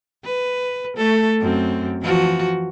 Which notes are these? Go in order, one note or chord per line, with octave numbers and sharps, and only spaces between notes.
B4
A3 A4
F#2 C4
E3 F3 F#4